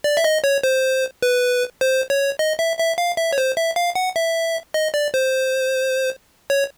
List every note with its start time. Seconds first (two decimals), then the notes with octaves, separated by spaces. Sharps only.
0.04 D5
0.17 E5
0.24 D#5
0.44 C#5
0.63 C5
1.22 B4
1.81 C5
2.10 C#5
2.39 D#5
2.59 E5
2.79 E5
2.98 F5
3.17 E5
3.33 C#5
3.38 C5
3.57 E5
3.76 F5
3.95 F#5
4.16 E5
4.74 D#5
4.94 D5
5.14 C5
6.50 C#5